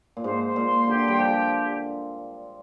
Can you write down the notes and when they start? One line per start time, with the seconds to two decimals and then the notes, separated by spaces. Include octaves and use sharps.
0.17 A#2
0.24 G#2 C5
0.45 C5
0.56 A#2
0.67 C6
0.87 D3 G4
1.07 G3 G5
1.19 F3
1.29 G4